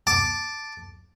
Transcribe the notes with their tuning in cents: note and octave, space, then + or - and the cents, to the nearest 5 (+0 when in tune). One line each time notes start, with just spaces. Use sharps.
A5 +0 D6 +0